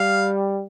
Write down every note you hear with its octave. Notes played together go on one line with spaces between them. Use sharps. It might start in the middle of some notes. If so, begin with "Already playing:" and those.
Already playing: G3 F5